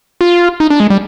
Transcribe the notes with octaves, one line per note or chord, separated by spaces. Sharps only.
F4
D#4
D4
G#3
G3